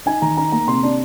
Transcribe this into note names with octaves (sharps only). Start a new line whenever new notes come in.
D#4 G#5
D#3 A#5
D#4 A#5
A#3 A#5
C3 C6
D4